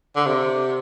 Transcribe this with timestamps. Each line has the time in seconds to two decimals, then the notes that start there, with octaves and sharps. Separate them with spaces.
0.16 D3
0.27 C3